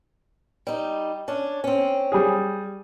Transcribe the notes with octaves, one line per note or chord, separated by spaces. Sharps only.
G3 D#4
C#4 D4
C4 C#4
G3 G#4